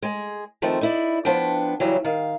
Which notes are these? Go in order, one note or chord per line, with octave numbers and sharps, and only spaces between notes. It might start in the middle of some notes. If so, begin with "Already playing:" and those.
G#3 G#4
D#3 F3 A3 C4
D#4 E4 D5
F3 B3 D4 G5
C#3 E3 F#3 G3
D#3 F5